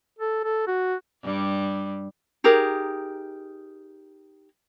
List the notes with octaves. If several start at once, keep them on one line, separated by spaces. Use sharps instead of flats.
A4
A4
F#4
G2 G3
D#4 G4 G#4 A#4